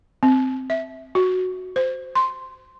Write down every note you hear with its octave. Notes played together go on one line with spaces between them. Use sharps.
C4
E5
F#4
C5
C6